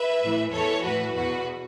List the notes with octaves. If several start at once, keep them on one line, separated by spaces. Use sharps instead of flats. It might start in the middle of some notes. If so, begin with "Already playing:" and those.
Already playing: B4 E5
A2 E3
E2 E3 A4 C#5
A2 E3 F#4 B4
E2 B2 F#4 B4